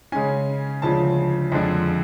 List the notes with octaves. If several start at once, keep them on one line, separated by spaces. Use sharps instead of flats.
C#3 G#3 C#4 G#5
D2 C#3 F3 G#3 D4 A5
F2 D3 G#3 D4